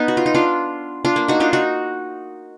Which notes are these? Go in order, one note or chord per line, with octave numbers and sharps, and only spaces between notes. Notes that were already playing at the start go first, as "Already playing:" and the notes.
Already playing: B3 D#4
F#4
F4
D#4
D4 F4
D4 F4
A#3
D#4 F#4
D4 F4
D#4 F#4